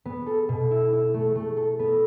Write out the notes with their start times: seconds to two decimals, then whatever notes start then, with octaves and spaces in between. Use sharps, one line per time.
0.05 B3
0.26 A4
0.49 B2
0.71 E4
0.93 E4
1.14 A3
1.35 A3
1.57 A4
1.79 B3